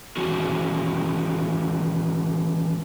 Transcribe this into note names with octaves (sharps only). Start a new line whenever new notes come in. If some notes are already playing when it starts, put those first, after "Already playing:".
D#3 E3 G#3 C#4 F#4